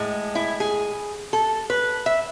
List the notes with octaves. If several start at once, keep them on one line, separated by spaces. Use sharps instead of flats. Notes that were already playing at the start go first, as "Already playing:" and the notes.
Already playing: A2 G#3
E4
G#4
A4
B4
E5